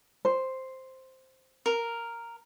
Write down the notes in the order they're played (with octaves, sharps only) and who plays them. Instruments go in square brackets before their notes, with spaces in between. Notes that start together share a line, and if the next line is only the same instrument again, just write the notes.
[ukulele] C5
[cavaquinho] A#4